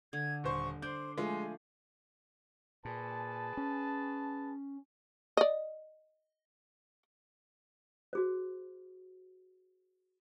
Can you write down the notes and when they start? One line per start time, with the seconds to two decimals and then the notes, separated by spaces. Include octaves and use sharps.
0.13 D3 G#6
0.44 D#1 C5 C#6
0.82 D4 C5 G6
1.18 F3 G#3 A3 G#5
2.85 A#2 G#4 B4 A5
3.57 C#4
5.37 D5 D#5
8.13 F#4 G#4 C5